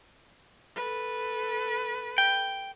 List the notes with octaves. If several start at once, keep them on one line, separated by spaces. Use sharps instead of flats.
A4 B4
G5